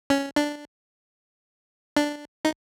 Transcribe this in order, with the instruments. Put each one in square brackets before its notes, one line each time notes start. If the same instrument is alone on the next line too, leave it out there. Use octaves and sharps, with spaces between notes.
[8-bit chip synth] C#4
D4
D4
D#4